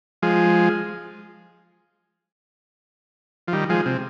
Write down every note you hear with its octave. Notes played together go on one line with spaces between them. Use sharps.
F3 G#3
F3
D#3 G3
F3 G#3
C3